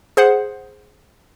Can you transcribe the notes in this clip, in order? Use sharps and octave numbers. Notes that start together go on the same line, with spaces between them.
G#4 C5 F#5